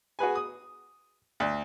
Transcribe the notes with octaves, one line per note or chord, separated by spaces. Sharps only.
F#4 G#4 B4 G#5
D#6
D2